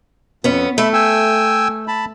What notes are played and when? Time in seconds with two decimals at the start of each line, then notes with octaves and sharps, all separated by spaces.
0.44 F2 B3 C#4
0.78 A3 E5 B5
0.94 G5 G#5 E6
1.88 A5 B5